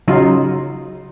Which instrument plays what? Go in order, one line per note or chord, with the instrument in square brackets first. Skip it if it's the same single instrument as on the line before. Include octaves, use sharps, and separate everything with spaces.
[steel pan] C#3 F#3 D#4 F4